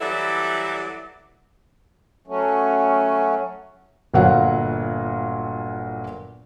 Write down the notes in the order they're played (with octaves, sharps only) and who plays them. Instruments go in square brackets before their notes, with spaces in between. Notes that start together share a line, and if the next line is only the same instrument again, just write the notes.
[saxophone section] E3 F#3 G3 E4 A4 D5
[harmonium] F#3 A3 C#4
[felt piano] G1 A#2 F#3 F5 F#5